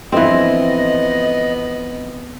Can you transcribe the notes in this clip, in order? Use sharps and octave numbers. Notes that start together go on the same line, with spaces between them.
G1 F2 E3 B3 C4 F4 D#5